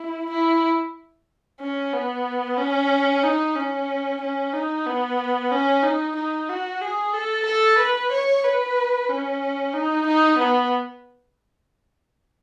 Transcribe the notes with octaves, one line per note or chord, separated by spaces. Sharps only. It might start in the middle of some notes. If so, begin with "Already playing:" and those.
Already playing: E4
E4
C#4
B3
C#4
D#4
C#4
C#4
D#4
B3
C#4
D#4
D#4
F#4
G#4
A4
A4
B4
C#5
B4
C#4
D#4
D#4
B3